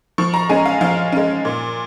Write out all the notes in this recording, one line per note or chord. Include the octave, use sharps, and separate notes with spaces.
F3 C#6
A#5
G#3 C#4 G#5
F5
F3 F5
G#3 C#4
A#2